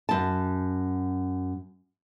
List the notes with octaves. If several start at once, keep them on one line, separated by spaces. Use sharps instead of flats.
F#2 A5